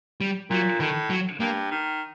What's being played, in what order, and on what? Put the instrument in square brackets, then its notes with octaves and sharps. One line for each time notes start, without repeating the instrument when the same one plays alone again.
[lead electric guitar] G3
[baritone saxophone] A#2 [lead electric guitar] F#3
[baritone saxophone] A2 [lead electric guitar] D#3
[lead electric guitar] F#3
[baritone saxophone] G2 [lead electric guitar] A#3
[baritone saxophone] D#3